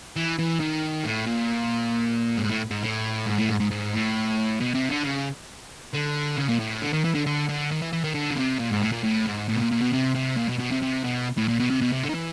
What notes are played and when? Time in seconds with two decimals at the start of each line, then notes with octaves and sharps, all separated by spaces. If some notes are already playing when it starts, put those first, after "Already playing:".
0.16 E3
0.39 E3
0.60 D#3
1.04 A2
1.27 A#2
2.38 G#2
2.50 A2
2.71 G#2
2.83 A2
3.26 G#2
3.38 A2
3.49 G#2
3.60 G#2
3.71 G#2
3.93 A2
4.61 B2
4.75 C3
4.89 D3
5.04 C#3
5.94 D3
6.37 C#3
6.49 A#2
6.60 A2
6.82 D3
6.93 D#3
7.04 E3
7.15 D3
7.26 D3
7.49 D3
7.71 D#3
7.82 E3
7.93 E3
8.04 D#3
8.14 D3
8.31 C#3
8.37 C3
8.59 A#2
8.71 G#2
8.82 A2
8.92 A#2
9.03 A2
9.26 G#2
9.48 A2
9.53 B2
9.60 A#2
9.71 A#2
9.81 B2
9.92 C3
10.14 C3
10.36 A#2
10.48 B2
10.59 B2
10.71 C3
10.82 C3
11.04 B2
11.37 A2
11.48 A#2
11.59 B2
11.70 C3
11.81 B2
11.92 C3
12.03 D3
12.09 D#3
12.14 E3